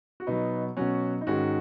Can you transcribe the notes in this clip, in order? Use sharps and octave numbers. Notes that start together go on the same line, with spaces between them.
F#4
B2 F#3 B3 D#4
B2 F#3 C#4 F#4
D#4
G#2 D#3 G#3 C#4 F#4